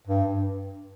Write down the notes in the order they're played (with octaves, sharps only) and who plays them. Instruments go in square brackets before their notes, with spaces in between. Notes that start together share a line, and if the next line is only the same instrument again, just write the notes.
[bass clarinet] G2